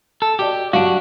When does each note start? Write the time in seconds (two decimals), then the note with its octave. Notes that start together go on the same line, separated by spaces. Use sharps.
0.22 A4
0.39 F#4 G4 D5 D#5
0.73 G2 F#3 D4 F#4 F5